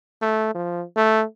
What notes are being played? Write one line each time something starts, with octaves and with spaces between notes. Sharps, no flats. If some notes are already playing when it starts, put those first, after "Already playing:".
A3
F3
A3